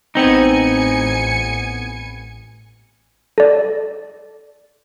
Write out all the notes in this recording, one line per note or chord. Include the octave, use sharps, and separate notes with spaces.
A1 B3 C4 D#4 G#5 C#7
A4 D5